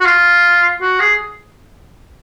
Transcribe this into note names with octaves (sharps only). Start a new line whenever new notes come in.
F#4
F4
F#4
G#4